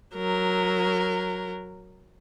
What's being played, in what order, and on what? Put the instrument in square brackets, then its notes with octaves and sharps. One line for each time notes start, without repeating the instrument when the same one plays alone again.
[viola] F#3 A#4